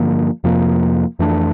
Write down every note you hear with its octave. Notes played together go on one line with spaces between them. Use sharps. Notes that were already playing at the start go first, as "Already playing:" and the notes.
Already playing: G2 D3 F3 A#3
F2 C3 F3 A#3
F2 E3 A3 D4